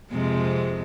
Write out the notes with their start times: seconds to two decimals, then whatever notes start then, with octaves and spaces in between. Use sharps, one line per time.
0.11 F2 C3 G#3